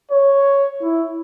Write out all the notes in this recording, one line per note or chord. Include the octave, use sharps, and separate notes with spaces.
C#5
E4